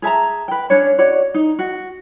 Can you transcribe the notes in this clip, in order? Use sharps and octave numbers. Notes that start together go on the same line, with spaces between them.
G#4 E5 A5 A#5
B4 G5
C#4 D4 C#5
F#4 C#5 D5
D#4
F#4